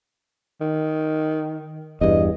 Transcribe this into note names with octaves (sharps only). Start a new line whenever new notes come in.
D#3
E2 G2 D#5